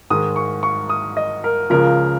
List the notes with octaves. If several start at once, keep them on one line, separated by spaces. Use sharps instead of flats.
G#2 D#3 G#3 D#6
C#6
C#6
D#6
D#5
A#4
C#2 C#3 F3 A#4